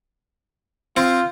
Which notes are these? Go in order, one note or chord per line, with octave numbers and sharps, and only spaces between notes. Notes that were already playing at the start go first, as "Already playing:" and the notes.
C4 F4